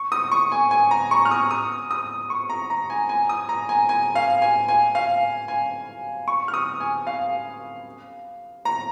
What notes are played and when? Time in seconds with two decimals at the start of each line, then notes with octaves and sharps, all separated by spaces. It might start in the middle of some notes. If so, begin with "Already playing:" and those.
Already playing: C#6
0.12 D#6
0.31 C#6
0.52 G#5
0.71 G#5
0.91 A#5
1.11 C#6
1.25 F6
1.31 D#6
1.51 D#6
1.91 D#6
2.30 C#6
2.50 A#5
2.70 A#5
2.90 G#5
3.09 G#5
3.29 D#6
3.49 A#5
3.69 G#5
3.89 G#5
4.15 F5
4.42 G#5
4.68 G#5
4.95 F5
5.48 G#5
6.28 C#6
6.48 F6
6.54 D#6
6.80 G#5
7.07 F5
8.65 A#5